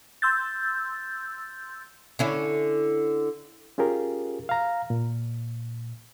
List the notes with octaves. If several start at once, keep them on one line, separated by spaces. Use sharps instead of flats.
C6 E6 G6 A6
D3 C#4 E4
C#4 F4 G4 G#4 A#4
F5 A#5
A#2